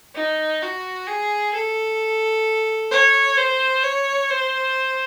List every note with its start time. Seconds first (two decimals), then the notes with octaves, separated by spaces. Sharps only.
0.15 D#4
0.62 F#4
1.07 G#4
1.54 A4
2.91 C#5
3.37 C5
3.83 C#5
4.30 C5